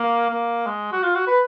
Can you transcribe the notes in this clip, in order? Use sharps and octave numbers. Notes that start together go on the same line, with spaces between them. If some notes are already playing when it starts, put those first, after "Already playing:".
Already playing: A#3
A#3
G#3
F#4
F4
F#4
B4